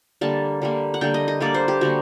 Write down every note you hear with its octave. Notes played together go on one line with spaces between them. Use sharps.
D3 G3 A#3 A5
D3 G3 A#3
F#5
D3 G3 A#3 G5
D#5
D#5
D3 G3 A#3 D5
C5
G4
D3 G3 A#3 F#4